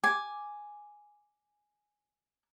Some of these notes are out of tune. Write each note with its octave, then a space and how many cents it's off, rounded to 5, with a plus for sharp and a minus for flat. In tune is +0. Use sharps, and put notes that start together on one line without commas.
G#5 +0 D6 +0